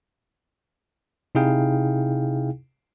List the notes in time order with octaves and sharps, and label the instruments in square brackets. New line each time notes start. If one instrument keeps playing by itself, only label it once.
[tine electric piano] C3 D#4 E4 G#4 F5 G5